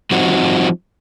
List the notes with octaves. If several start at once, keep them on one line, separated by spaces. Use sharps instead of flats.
F3 G3 C4 D#4 F#4